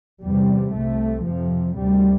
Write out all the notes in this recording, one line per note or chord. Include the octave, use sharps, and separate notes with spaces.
E2 C3 G3
C2 C3 A3
F2 C3 F3
D2 C3 G3